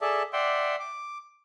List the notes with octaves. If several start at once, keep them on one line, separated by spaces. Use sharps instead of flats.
G#4 A4 D5 E5 A5
D5 E5 F#5 G5 C6
D6